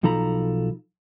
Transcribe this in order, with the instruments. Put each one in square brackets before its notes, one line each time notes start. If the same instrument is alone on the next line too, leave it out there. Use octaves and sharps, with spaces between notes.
[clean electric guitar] B1 F3 D#4 A4 A#5 B5